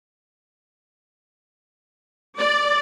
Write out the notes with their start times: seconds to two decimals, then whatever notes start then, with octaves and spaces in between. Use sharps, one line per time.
2.39 D5